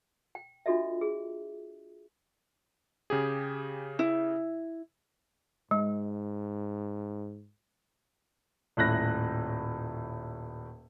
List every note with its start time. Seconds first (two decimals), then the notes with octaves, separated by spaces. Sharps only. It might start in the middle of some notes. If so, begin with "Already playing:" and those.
0.35 G5
0.66 D4 F4 F#4 A4 D#5 E5
1.01 G#4
3.10 C#3 G4 G#4
3.99 E4
5.71 G#2 G#3
8.77 D#1 A2 F#6 A#6